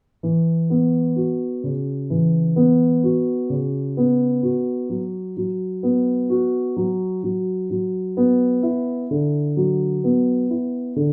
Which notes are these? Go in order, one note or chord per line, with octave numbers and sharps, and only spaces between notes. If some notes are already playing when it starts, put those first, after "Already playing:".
E3
B3
F#4
C#3
E3
B3
F#4
C#3
B3
F#4
F#3
F#3
B3
F#4
F#3
F#3
F#3
B3
E4
D3
F#3
B3
E4
D3